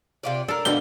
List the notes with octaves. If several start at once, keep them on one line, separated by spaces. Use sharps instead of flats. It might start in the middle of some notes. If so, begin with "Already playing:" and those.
C3 F4 D5
D4 A4 A#4
B2 D3 A#3 B3 G4 G7